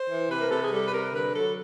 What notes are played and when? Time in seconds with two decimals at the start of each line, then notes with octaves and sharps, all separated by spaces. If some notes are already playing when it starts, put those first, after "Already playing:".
Already playing: C5
0.08 E3
0.29 C3 B4
0.41 A#4
0.50 C3 A4
0.62 G#4
0.70 G3 A4
0.85 B4
0.92 C3 A#4
1.13 D3 B4
1.33 F#3 A4